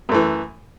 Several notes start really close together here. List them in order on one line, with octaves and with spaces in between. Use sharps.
F#2 A3 E3